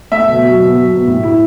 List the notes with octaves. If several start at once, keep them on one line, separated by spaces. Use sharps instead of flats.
A3 E5
B2
F#3
B2
F#3
B2
A2
E4